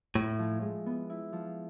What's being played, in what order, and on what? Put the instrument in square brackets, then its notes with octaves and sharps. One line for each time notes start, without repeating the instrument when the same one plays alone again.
[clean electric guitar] A2 [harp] E4
[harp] F3
G#3
B3
E4
F3